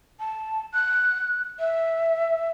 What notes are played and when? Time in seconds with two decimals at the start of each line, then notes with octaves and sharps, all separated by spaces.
0.20 A5
0.74 F#6
1.59 E5